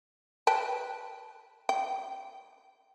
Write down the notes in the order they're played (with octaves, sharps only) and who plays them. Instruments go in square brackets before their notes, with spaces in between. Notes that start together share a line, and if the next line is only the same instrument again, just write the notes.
[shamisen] B4 G5 A5
G5